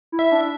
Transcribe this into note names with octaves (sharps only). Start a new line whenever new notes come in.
E4
E5
D4